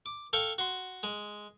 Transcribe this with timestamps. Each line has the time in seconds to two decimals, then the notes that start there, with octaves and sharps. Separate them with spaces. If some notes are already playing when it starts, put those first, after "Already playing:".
0.06 D6
0.33 A4 F5 G5 C#6
0.58 F#4 C6
1.03 G#3